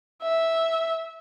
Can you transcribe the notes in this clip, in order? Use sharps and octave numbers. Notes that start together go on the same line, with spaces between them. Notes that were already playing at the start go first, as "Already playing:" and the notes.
E5